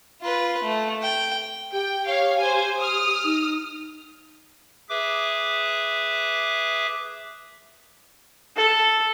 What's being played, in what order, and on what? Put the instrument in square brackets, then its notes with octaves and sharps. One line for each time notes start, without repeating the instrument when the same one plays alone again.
[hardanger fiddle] F4 B4
A3
G5
[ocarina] G4 [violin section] G5
[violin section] C#5 F5
C5 G#5
D#6 F6
[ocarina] D#4
[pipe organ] G#4 B4 E5 D6
[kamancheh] A4